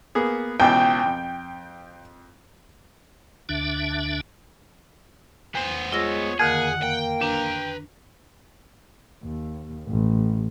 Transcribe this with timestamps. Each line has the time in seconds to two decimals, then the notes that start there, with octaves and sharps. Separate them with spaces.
0.15 A#3 B3 G#4
0.60 C#2 B2 E3 G5
1.06 F2
3.49 D2 D3 D4 E5
5.55 E2 B3 C5
5.92 G#3 F4 C#5 E6 A#6
6.40 F2 D3 D#3 A#3 G#4 F#5
6.83 A#3 G5
7.21 D4 B4 G5 A#5
9.23 D#2
9.87 A1